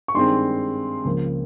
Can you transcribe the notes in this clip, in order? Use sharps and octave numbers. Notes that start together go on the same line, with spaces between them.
C#6
G2 D#3 G#3 C4 C6
C#2 C#3 F3 A#3